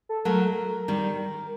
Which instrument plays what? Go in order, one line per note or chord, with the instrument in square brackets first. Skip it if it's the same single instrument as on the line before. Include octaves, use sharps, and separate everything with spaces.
[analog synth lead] A4
[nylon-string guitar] F#3 A3 [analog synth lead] A#4
[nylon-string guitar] D#3 G3